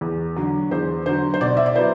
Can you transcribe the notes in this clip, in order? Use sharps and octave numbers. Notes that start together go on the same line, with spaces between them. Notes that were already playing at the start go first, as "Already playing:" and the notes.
E2
D3 F#3
E2 C5
D3 F#3 C5
C5
B2 D5
E5
D5
F#3 B3 E4 C5